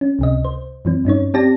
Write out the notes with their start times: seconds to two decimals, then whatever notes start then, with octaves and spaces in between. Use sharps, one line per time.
0.01 C#4
0.19 C#2 C3 D#5
0.45 C5
0.85 F#2 E3 C4
1.05 G2 C#4 D#4 C#5
1.34 C4 G4 D5 A5 A#6